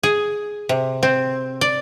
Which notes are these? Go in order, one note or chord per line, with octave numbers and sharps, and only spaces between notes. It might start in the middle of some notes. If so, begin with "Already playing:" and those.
G#4
C3
C4
D5